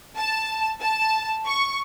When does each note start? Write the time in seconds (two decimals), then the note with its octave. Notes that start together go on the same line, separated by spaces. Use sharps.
0.17 A5
0.83 A5
1.47 C#6